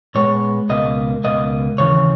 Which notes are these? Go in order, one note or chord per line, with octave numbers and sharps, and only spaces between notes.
A#2 G#3 B3 C#5
C#2 B2 A#3 D#5
C#2 B2 A#3 D#5
D#2 C#3 E3 C#5